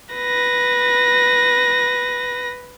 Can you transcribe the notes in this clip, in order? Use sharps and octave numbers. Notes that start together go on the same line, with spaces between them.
B4 A#6